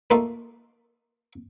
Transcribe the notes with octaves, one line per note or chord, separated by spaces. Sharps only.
A3 A#3 D#4 F4 A4